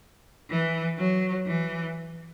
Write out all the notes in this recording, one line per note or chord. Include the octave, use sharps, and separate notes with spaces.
E3
F#3
E3